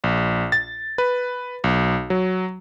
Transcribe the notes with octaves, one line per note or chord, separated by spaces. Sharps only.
A#1
A6
B4
B1
F#3